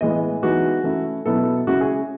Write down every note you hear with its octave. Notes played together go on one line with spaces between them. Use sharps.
A2 E3 G#3 B3 D#5
E3 G#3 B3 D#4 F#4
E3 A3 C#4 E4
B2 F#3 B3 E4 A4
C#3 G#3 C#4 E4 F#4
G#4